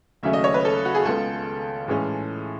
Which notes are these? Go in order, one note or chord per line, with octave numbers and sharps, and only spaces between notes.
D#2 C#3 F#3 A3 C#4 E5
D#5
C#5
B4
A4
F#4
G#4
C#2 C#3 G#3 B3 A4
A2 E3 G#3 C#4